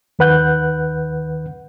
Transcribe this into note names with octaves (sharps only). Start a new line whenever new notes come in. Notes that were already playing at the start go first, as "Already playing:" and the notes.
D#2 D#3 B4 F#5 F#6 G6